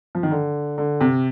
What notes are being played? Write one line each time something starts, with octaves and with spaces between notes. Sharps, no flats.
F3
D#3
D3
D3
C3